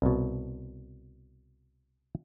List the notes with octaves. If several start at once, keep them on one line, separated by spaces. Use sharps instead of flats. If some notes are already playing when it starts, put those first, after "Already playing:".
C2 B2